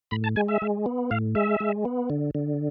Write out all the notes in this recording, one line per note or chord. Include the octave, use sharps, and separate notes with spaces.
A2 B5
A5
G#3 G#5
E5
G#3
B3
A2 F5
G#3 E5
G#3
B3
D3
D3